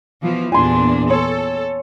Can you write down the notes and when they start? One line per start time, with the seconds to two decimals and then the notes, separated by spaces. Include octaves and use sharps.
0.22 B2 E3 F3
0.52 E2 A#2 D4 G#5 C6
1.10 A4 C#5